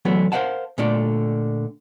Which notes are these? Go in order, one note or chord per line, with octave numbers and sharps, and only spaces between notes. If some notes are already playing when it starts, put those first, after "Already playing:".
D2 E3 F#3 A3 B3
A#4 C5 D5 F5 F#5 A5
A#2 D3 A3 D5